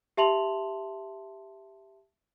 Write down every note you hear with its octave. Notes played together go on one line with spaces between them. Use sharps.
G4 E5 A5 C6 F7 F#7